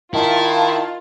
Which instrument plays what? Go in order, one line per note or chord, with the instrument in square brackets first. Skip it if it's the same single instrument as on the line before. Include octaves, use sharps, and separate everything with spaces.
[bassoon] D#3 [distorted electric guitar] E4 [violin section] F4 [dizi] A5